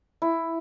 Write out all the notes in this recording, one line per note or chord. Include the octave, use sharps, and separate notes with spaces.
E4